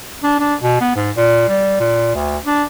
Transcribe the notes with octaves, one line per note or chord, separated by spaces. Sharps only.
D4
D4
B2
B3
G#2
A#2
G3
A#2
D2
D4